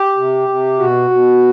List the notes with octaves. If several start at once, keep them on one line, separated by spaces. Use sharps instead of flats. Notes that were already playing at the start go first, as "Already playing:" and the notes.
Already playing: G4
C3
C3
B2 F#4
B2